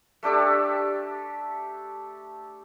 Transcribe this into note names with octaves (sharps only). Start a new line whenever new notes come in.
A3 D4 G4 A4